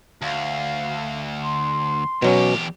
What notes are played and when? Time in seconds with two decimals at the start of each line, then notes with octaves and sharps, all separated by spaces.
0.22 D2 F5
1.42 C6
2.22 E2 B2 F#3 C#4 G4